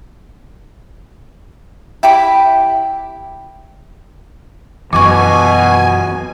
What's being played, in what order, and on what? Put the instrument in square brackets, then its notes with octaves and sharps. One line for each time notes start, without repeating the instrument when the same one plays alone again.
[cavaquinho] E4 G4 B5 D6
[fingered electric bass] F#2 E3 [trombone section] B2 [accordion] G#5 [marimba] C#6 D6